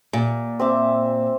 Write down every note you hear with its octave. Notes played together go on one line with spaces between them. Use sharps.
A#2
C4 E5 D6